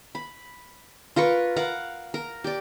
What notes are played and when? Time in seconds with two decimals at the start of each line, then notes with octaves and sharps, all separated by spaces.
0.15 B5
1.16 F4 A#4 B4 C#6
1.56 A#4 F5 F#5
2.14 A#4
2.44 G4 D5